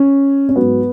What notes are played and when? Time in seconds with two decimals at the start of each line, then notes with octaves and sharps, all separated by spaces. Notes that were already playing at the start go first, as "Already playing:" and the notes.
Already playing: C#4
0.49 C#4
0.56 G#2 F#3 B3